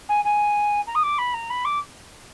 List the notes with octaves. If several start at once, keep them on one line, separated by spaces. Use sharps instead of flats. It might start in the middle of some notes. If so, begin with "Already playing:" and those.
G#5
G#5
A#5
D#6
D6
B5
A#5
B5
D6